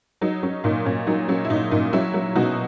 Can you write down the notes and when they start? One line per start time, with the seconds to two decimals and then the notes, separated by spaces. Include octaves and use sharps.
0.21 F#3 D#4
0.43 F#3 C#4
0.64 A#2 D#4
0.85 A#2 C#4
1.07 F#3 D#4
1.28 F#3 C#4
1.45 E4
1.50 A#2 D#4
1.71 A#2 D#4
1.93 F#3 C#4 E4
2.14 F#3
2.35 B2 D#4 F#4